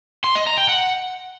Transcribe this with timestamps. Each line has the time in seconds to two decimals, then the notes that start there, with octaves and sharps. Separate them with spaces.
0.24 C6
0.35 D#5
0.47 A#5
0.58 G5
0.69 F#5